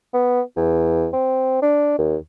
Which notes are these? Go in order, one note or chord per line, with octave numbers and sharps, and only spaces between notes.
B3
E2
C4
D4
D#2